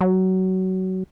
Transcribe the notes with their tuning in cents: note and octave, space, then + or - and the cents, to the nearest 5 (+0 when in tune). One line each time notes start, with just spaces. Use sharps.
F#3 +20